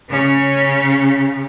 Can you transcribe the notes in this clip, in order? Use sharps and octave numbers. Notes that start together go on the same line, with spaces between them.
C#3 C#4